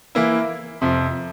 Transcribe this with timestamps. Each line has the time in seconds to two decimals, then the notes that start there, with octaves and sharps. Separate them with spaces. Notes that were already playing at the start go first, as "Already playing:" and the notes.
0.15 E3 A#3 E4
0.81 F2 C3 F3